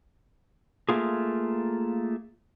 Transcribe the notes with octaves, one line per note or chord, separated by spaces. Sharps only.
A3 A#3 F4 G#4